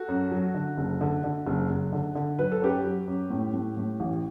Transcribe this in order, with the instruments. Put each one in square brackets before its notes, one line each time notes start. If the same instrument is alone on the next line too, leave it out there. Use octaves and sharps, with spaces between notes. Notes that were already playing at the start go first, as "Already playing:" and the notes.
Already playing: [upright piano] F#4 A4
F#2
F#3
D3
F#1
D3
D3
F#1
F#1
D3
D3
F#3 B4
A4
F#2 G4 B4
F#3
F#2
A2
A2
A2
A1